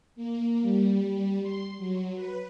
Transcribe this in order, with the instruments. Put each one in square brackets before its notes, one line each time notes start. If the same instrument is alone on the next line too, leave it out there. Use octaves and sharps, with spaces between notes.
[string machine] A#3
G3
C6
F#3
B4